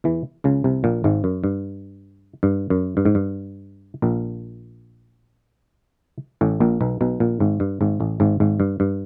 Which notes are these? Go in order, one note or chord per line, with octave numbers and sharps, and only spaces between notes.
E2 E3
C#2 C#3
C2 C3
A#1 A#2
G#1 G#2
F#2
G2
G2
F#2
G2
G#2
G2
A#1 A#2
A1 A2
A#1 A#2
B1 B2
B1 B2
A#1 A#2
G#1 G#2
G2
G#1 G#2
A1 A2
G#1 G#2
G#1 G#2
G2
G2